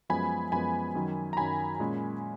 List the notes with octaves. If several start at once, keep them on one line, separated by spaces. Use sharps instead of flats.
F#2 F3 G#3 B3 G#5 B5
F#2 F3 G#3 B3 G#5 B5
F#2 D#3 F#3
A#5
F#2 D#3 F#3 G#5 B5
A#2 G#3 C#4